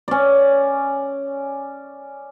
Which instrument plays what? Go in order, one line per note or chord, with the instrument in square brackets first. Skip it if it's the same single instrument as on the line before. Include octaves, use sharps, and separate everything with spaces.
[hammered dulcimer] C#4 D5